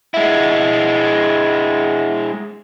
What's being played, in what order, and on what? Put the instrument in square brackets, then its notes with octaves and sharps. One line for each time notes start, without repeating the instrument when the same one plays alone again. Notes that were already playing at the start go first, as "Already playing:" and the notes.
[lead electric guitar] G#3 E4